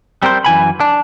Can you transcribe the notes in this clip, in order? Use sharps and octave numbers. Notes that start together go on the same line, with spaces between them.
G3 C4 A#4 C5
F#2 E3 G#5 B5
D4